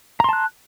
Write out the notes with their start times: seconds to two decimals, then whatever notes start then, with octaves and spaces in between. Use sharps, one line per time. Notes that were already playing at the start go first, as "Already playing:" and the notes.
0.20 A#5
0.24 C6
0.29 A5
0.33 F#6